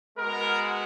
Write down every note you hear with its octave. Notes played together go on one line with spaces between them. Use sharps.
G#3 B3 F#4 A#4